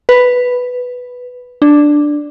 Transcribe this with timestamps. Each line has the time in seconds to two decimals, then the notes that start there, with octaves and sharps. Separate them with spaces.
0.09 B4
1.62 D4